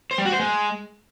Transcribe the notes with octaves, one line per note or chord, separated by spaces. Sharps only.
C5
G3
F#4
C5
G#3